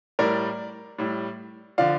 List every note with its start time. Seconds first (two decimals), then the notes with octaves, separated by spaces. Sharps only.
0.19 A2 G3 A#4 D5
0.98 A2 G3
1.78 D3 F3 D5 F5